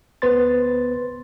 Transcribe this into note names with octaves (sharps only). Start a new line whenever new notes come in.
D2 B3 B4 C5 C6 A6